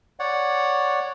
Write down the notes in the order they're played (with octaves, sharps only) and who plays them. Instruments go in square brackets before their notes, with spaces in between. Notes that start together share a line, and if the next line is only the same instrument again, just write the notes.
[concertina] C#5 D5 F#5